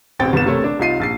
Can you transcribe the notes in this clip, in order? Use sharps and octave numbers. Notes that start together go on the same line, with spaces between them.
E1 A1 C4 G5 A6
G1 C2 B3 E7
E1 C3 A3 A#4 C#5
D4
C2 D#4 F4 C7 D#7
A#1 A6 C7